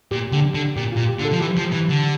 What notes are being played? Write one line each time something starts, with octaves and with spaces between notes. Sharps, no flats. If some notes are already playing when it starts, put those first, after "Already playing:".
A#2 G4
D3 G4
D3
A#2 G4
A#2 F4
G4
D3
A4
F3
E3 G4
F3
E3
D3